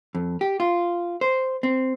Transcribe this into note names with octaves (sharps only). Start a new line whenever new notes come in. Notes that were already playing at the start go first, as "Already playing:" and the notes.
F2
G4
F4
C5
C4